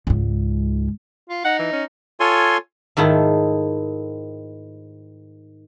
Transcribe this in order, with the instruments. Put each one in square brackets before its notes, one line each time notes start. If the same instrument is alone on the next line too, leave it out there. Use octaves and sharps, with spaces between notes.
[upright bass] C#2 G#2
[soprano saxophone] F4
[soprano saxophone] D#4 [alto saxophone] F#5
[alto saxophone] E3
C#4
[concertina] F4 A4 C#5 G#5 C6
[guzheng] G#2 D#3 A3 E4 F4